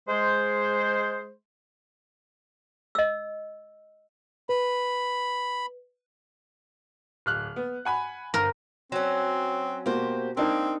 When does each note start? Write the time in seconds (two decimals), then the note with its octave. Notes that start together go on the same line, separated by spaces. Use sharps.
0.09 G#3 C5
2.95 D#5 E6
4.49 B4 B5
7.26 D1 F6 F#6
7.56 B3
7.85 F#5 G#5 B5
8.34 G1 A#4
8.92 F#3 C4 C#4
9.86 B2 A#3 F#4 G4 C5
10.37 A#3 C4 D4 D#4 A#4